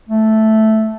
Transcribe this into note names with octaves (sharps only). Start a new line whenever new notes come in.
A3